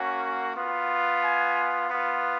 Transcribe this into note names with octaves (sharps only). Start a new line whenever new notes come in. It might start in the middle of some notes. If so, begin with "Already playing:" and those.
Already playing: A#3 C#4 F#4
B3 F4
G#5
B3 F4